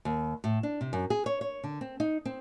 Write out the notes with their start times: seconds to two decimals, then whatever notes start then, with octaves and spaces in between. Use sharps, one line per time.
0.05 D#2
0.44 A2
0.63 D4
0.81 C3
0.93 F#2
1.10 G#4
1.26 C#5
1.41 C#5
1.64 D3
1.81 C4
2.00 D#4
2.25 C4